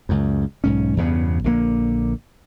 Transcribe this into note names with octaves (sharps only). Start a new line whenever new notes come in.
C#2 F#2
B1 G#2 C#4
E2 G2 C#3 B3
A#1 D3 A#3